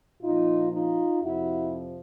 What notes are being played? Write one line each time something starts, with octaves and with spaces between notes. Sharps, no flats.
A#2 F3 D#4 F4
D#4 F4
F2 C3 F3 E4 F#4